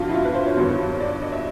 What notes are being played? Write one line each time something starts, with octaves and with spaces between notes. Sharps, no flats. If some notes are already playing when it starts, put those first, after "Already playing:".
Already playing: F2 D3 F4 F#4
E4
F4
B4
C5
C#5
G1 G2 D#3 F#3
D5
C#5
D#5
E5